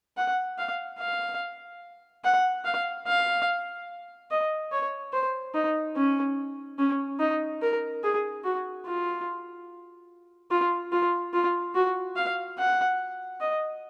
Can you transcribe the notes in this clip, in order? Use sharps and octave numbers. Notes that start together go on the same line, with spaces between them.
F#5
F5
F5
F#5
F5
F5
D#5
C#5
C5
D#4
C#4
C#4
D#4
A#4
G#4
F#4
F4
F4
F4
F4
F#4
F5
F#5
D#5